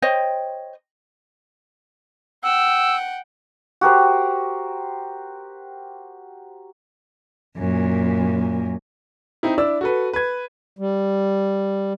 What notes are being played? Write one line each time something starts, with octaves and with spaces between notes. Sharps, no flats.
C5 C#5 D#5 G5
F#5 G5 E6
F#4 G4 A#4 C5
F#2 A#2
C4 D#4 E4
D4 E4 D5 E6
F#4 A4 B4
B4 G#6
G3